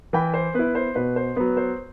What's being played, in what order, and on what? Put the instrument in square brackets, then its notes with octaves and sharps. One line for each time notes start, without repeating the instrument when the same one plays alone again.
[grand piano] E3 G5 B5
C5
B3 E4 B4
C5
B2 B4
C5
F#3 B3 B4
C5